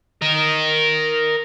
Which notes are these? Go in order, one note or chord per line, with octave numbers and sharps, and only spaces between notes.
A#4 D#5